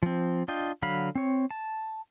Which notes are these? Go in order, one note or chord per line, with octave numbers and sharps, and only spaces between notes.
F3 C4
D4 F4 D#5 G5
D3 F#3 F5 B5
C4 C#5
A5